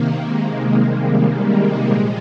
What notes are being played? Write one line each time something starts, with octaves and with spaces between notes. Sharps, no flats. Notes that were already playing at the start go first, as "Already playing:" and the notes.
Already playing: C3 D#3 A#3
G#3
G3
G#3
A#2 F3 G#3